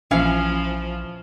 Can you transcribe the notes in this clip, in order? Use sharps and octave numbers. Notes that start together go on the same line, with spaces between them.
A#1 E3 F3 C#4 F5